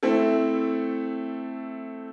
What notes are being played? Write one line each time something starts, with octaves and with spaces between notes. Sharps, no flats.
A3 C4 E4 A4